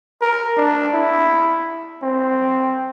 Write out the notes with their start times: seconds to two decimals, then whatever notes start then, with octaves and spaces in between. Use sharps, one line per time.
0.21 A#4
0.57 D4
0.94 E4
2.03 C4